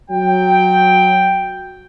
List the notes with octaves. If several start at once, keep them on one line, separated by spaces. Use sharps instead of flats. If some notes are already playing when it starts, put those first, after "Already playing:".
F#3 G5